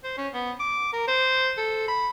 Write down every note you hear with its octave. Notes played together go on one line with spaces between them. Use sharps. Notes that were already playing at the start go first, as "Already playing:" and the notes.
C5
C#4
B3
D6
A#4
C5
A4
B5